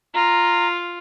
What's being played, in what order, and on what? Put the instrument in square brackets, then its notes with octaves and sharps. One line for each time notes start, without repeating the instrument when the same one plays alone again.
[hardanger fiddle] F4 [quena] A#5